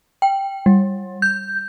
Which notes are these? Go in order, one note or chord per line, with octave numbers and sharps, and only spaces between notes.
G5
G3
G6